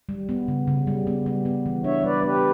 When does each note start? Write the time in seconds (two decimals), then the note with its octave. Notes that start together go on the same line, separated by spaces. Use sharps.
0.09 G3
0.29 B3
0.48 C#3
0.67 C#3
0.87 G3
1.07 B3
1.26 G3
1.45 B3
1.66 E3
1.84 D4 C#5 E5
2.04 G3 B4 D5
2.23 B3 G4 B4